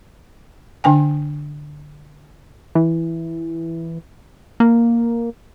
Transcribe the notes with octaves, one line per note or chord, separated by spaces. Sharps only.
D3 D4 G5 G#5
E3
A#3